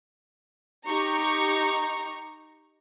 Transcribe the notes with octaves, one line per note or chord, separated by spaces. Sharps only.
D#4 G4 A#5 C#6